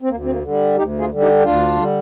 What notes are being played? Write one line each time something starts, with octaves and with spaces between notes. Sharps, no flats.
C4
D2 A#3
C4
A#3
D3 G3
D2 D#4 G4
F4 G#4
D3 G3
D#4 G4
G4
D2 D4 F4
D3 G3